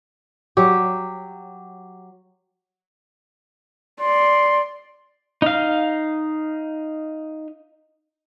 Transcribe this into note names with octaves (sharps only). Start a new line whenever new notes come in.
F#3 G4
D5 C6
D#4 F5